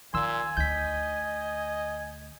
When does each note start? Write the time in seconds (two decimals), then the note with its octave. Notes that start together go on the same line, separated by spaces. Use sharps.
0.14 A#2 D#3 G#5 C6 E6
0.57 D2 D#4 D#5 G6 B6